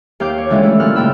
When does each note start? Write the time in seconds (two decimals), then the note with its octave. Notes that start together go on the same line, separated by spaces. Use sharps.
0.20 D#2 G4 F5 D6 G6
0.38 C#5
0.50 D3 E3 G#3 C#4 E4 G4
0.63 A3 E4
0.80 F#2 A#2 F6 F#6
0.95 G#2 C#3 G5 B5 E6